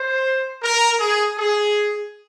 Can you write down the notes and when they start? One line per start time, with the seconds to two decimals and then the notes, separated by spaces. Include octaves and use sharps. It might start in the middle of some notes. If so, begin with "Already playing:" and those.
Already playing: C5
0.62 A#4
1.00 G#4
1.38 G#4